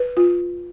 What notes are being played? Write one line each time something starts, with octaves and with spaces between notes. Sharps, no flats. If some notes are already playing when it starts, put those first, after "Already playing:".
Already playing: B4
F4